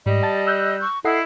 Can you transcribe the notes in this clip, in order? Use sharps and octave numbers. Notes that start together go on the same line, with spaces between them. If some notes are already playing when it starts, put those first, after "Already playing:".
G#2 G3 D#5
G5 A5 A6
E6 F#6 G6
C#6
E4 A4 D#5 F#5 C7